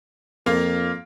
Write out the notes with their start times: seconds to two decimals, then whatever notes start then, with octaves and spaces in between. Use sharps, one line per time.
0.46 F2 A#3 F4